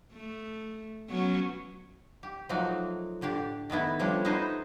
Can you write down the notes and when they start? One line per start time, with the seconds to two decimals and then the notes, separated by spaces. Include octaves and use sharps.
0.12 A3
1.09 F#3 B3 C#4
2.23 G4
2.49 F3 F#3 A3 A#3 D#4 F#4
3.21 A2 D3 G4 D5
3.70 D#3 A3 B3 E4
3.99 F3 G3 A3 C#4 D4 C#5
4.25 D#4 E4 F#4 A4 C5 D#5